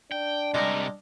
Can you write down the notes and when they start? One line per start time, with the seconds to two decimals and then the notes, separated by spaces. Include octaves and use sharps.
0.12 D4 G5
0.54 C3 G3 G#3 A#4 A#5